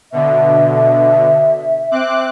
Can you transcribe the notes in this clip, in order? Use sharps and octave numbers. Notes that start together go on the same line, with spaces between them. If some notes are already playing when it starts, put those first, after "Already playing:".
B2 D3 E5
C4 D6 F#6